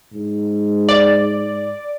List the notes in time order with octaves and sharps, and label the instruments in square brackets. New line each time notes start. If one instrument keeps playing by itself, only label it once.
[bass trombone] G#2
[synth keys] D5